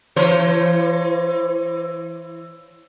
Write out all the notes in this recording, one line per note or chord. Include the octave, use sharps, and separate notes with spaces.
E3 C5 C#5